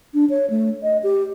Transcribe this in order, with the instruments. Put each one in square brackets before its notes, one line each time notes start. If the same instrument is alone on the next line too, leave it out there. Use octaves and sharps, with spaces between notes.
[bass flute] D4
C#5
A3
D#5
G4